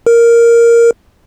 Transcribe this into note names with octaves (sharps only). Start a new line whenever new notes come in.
A#4